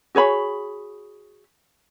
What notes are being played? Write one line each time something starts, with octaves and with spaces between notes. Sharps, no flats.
F#4 G#4 C#5 B5